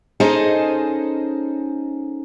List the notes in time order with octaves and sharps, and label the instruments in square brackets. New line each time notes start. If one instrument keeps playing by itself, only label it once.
[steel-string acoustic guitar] C#4 D#4 G#4 A4 C5 D#5